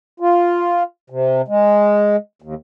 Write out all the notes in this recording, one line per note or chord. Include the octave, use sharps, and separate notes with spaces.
F4
C3
G#3
D#2